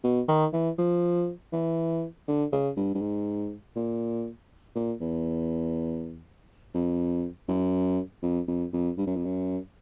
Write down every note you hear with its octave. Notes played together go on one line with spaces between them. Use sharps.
B2
D#3
E3
F3
E3
D3
C#3
G2
G2
G#2
A#2
A#2
E2
F2
F#2
F2
F2
F2
G2
F#2
F2
F#2